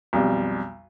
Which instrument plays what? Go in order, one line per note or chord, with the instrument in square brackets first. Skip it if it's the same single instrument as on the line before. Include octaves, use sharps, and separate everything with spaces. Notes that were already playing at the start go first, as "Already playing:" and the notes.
[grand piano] B1 F2 G3